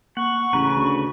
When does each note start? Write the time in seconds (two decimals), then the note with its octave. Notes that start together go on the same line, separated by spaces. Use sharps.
0.17 A#3 F#5 C#6
0.53 A1 C#3 B4 A#5
0.75 D2